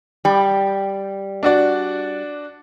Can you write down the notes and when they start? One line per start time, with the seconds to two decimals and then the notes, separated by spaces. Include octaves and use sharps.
0.25 G3
1.43 D4 F#4 D5